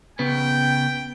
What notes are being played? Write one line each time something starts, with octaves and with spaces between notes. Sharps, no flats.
C#3 B3 G5